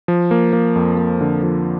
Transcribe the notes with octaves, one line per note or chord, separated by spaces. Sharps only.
F3
A#3
A#3
F2
A#3
D3
F3